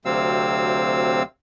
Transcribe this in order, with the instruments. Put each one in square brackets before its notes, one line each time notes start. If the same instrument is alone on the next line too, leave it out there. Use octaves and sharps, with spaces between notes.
[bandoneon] D2 C3 F#3 C4 F5 E6